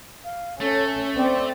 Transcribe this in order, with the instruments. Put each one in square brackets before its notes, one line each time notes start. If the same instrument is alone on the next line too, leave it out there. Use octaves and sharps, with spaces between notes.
[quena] F5
[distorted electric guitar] A3 [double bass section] C#4 [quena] A4
[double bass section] C4 [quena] D5